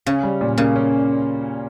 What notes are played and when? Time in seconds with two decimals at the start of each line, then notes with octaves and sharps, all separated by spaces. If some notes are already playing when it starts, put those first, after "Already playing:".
0.06 C#3 C#4
0.23 G3
0.41 A#2
0.58 C#3 A#3
0.76 C#4